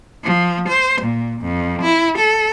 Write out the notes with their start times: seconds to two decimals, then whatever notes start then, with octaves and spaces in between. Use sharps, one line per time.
0.24 F3
0.69 C5
1.02 A#2
1.41 F2
1.82 E4
2.18 A4